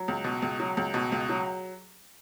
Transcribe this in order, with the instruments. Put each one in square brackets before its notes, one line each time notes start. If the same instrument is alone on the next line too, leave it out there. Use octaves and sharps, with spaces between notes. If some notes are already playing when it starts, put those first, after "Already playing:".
Already playing: [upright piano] F#3
C#2
B2
C#2
F#3
C#2
B2
C#2
F#3